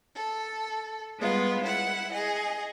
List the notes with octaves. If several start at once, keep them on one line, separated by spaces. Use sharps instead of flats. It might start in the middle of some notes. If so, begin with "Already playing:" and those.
A4
G3 G#3 B3 F4
E4 F#5
G#4 D#5